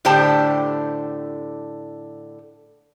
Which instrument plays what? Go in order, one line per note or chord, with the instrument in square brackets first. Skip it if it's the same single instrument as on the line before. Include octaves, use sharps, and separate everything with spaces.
[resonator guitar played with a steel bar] A2 D3 G4 C5 G5 A5